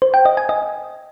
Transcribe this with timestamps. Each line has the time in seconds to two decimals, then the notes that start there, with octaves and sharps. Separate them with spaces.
0.02 C5
0.14 G5
0.25 D#5
0.37 G#5
0.49 D#5